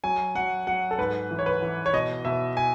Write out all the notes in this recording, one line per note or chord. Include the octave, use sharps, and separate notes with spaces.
F#3 G#5
F#3 F#5
F#3 F#5
A4
G#2 B4
E3
C#5
B4
E3
C#5
B2 D#5
B2 E5
G#5